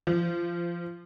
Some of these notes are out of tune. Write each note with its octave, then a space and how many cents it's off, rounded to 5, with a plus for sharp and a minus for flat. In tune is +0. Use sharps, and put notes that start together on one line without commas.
F3 -30